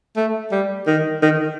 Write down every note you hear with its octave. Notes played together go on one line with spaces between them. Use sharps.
A3
G3
D#3
D#3